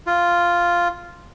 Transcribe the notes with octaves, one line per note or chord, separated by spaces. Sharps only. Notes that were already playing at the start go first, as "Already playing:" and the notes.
F4